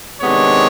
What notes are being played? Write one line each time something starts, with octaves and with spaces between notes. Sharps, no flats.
C3 D#3 G#3 B3 D4 C#5